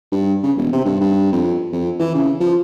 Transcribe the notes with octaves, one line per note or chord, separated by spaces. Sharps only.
G2
C#3
E1
C3
G2
G2
F2
F2
E3
C#3
F3